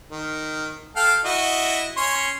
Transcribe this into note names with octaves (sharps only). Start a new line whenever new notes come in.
D#3
A4 F5 G5
E4 F#4 D#5
C#4 C#5 C6